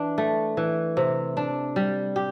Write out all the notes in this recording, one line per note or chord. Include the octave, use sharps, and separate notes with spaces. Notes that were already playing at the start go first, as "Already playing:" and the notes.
Already playing: E3 D4
A3
E3
C3
D4
G3
G4